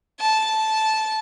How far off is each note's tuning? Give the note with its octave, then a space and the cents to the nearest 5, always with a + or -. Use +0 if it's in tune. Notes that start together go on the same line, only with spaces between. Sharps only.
A5 -10